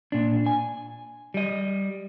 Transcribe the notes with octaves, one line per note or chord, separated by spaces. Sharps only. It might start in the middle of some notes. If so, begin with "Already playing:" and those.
A#2 D4
G#5
G3 D#5